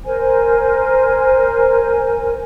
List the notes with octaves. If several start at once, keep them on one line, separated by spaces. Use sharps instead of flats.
A#4 C5 G#5